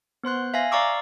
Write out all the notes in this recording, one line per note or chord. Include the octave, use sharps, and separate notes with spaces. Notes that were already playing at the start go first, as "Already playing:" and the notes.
B3 C5 C6 F#6
E5 F5 G#5 A#6
D5 F5 A#5 C#6 D6 E6